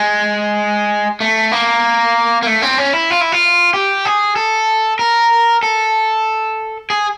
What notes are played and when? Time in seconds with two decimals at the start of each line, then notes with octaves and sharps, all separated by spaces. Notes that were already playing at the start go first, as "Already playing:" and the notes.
Already playing: G#3
1.20 A3
1.52 A#3
2.42 A#3
2.47 A3
2.62 C4
2.78 C#4
2.93 E4
3.10 F4
3.21 E4
3.32 F4
3.74 G4
4.05 G#4
4.36 A4
4.99 A#4
5.63 A4
6.90 G#4